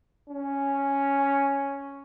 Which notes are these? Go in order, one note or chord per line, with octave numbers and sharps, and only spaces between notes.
C#4